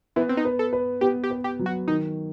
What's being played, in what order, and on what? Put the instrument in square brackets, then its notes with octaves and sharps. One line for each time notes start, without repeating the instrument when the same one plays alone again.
[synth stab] E3 [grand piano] B3
[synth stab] C4
D#4
[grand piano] B4
[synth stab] A4
[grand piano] B4
[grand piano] B3 [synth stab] G4
[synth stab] G4
[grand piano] B4
[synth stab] G4
[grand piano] F#3
[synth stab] F#4
[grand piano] D#3 [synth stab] D#4